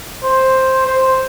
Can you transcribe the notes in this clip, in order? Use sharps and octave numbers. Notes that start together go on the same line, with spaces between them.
C5
C5